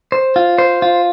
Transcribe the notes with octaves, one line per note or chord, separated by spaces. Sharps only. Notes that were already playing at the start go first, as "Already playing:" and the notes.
C5
F4
C5
F4